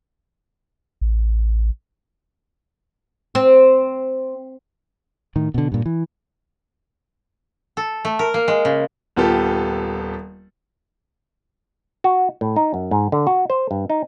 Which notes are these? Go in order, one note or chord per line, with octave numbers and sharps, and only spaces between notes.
A1
C4
A2 D#3
B2 D3
G2 A#2
E3
A4
A3
A#4
A#3
G#3
C#3
D#1 B3 F4 G4 A4
F#4
A2
D#4
F#2
G#2
D3
F#4
C5
G2
D#4